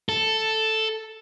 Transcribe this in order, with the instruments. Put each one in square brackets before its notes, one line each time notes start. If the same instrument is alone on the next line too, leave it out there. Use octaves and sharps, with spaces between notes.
[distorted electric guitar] A4